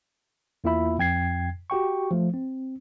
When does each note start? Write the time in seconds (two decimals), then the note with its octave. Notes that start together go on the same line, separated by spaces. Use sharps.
0.64 E2 A#3 E4 F4 E5 B5
0.98 F2 G5 G#6 C7
1.70 F#4 G4 G5 C#6
2.11 F3 A3
2.34 C4